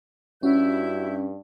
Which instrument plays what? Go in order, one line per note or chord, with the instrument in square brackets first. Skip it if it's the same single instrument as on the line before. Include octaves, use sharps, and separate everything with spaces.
[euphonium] G2 [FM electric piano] C#4 [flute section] E4 E5 G6 [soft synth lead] F#4